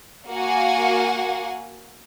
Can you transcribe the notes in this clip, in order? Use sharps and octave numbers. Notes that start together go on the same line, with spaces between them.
A#3 F#4 F5 F#5 G#5